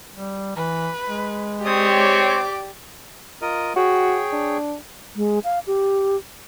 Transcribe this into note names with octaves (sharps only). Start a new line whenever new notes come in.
G3
E3 B4
G#3
C4 G4 C#5 D5 D#6
D6
F4 A#4 D#5
F#4 G#4 C#5 G5
D4
G#3
F5
G4